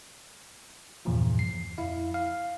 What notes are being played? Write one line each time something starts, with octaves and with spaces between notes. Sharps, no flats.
E2 G2 A#2 C#3 E3 F3
C7
F2 E4 F5
F5